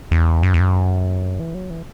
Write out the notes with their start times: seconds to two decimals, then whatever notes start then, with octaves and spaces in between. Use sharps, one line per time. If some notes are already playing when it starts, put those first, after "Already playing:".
0.11 E2
0.43 F#2
0.54 E2
0.60 F#2
1.40 E3
1.54 F#3
1.70 E3